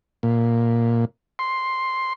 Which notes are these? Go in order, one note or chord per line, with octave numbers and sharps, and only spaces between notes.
A#2
C6